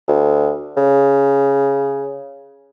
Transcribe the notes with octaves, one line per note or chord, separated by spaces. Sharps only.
D2
C#3